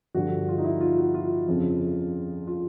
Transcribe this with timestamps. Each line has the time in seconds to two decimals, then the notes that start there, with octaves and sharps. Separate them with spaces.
0.14 G2 D3 F3 F#4
0.49 F4
0.58 D#4
0.64 E4
0.81 F4
0.98 F#4
1.14 F4
1.47 F2 C#3 F3
2.47 F4